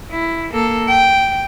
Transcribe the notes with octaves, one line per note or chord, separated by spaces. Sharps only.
E4
A#3 A4
G5